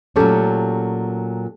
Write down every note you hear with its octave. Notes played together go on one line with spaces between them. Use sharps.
A#2 F#3 A3 C#4 G4 A4